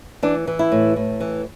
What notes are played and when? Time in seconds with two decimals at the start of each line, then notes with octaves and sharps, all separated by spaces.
0.23 E3 D4
0.47 E3
0.59 E4
0.72 A2
0.96 A2
1.20 E3